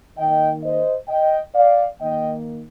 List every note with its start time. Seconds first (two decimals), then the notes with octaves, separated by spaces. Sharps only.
0.17 D#3 A#3 D#5 G5
0.63 C5 D#5
1.08 D#5 G5
1.54 D5 F5
2.00 D#3 A#3 D#5 G5